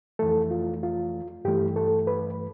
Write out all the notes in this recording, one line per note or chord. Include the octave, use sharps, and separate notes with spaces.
F2 E3 A3 A4
F4
F4
G2 E3 A3 G4
A4
B4